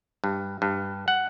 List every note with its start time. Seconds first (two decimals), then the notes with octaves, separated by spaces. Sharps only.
0.24 G2
0.62 G2
1.08 F#5